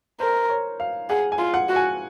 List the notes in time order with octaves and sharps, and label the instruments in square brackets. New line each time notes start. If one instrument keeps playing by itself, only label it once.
[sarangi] A#4 [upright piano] C5
[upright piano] C#5
F5
[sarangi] G#4 [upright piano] F#5
[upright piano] G#5
[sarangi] F4
[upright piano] F#5
[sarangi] F#4
[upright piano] G#5